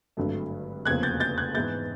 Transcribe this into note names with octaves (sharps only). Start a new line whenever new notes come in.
G#1 G2 D3 F#3 A3
F1 E2 C#3 F3 A#3 F#6 G#6
G6 A6
G6 A6
F#6 G#6
G#2 E3 G#3 B3 E4 G6 A6